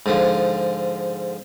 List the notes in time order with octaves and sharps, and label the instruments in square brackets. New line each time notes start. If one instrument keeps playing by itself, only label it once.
[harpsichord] G#2 D3 F3